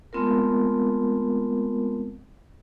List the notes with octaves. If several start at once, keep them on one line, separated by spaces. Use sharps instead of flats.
G#3 A3 B3 C4 F4 A#4